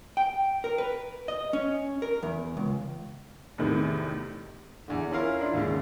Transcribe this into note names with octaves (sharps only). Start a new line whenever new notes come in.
G5
A#4
B4
D#5
C#4
A#4
E2
C#2
E2 A2 C3 D#3
E2 D3
C#4 E4 F4 A#4 F5
D4 E4 F4
D#2 G#2 C#3